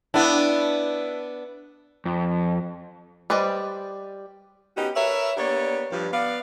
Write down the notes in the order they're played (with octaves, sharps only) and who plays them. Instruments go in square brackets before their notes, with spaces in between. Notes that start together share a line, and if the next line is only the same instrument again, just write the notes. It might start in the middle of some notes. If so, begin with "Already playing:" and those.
[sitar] B3 D4 [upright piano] E4
[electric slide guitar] F2
[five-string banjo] G3 B4 C5 D5 D#5
[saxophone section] B3 C#4 D#4 F#4 G4
A#4 B4 C#5 E5
A#3 B3 D4 G4 C#5 D5
G2 F3
B3 D5 F5